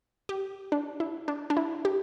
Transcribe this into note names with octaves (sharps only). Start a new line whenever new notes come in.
G4
D4
E4
D4
D4
E4
G4